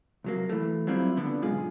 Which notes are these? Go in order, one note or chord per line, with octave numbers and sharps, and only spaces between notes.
C2 F#3 A#3
E3 A3
F#3 G3 C4 E4 F4
D3 B3 D4
B1 G#2 G#3 F4 G#4